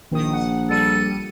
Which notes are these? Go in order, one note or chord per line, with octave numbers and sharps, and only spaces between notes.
A#1 D#3 D#6
F#5
G3 A4 C#7 D#7